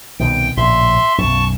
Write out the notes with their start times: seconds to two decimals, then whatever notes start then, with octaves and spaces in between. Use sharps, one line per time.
0.20 C2 B2 D#3 G5
0.57 A#1 A2 C#3 E5 C6
1.18 B1 F#2 A5 C#6